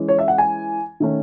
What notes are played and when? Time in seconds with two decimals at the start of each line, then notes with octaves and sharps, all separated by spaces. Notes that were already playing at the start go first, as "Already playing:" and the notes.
Already playing: E3 G#3 C#4
0.08 C#5
0.19 E5
0.28 F#5
0.38 G#5
1.00 D#3 A3 C#4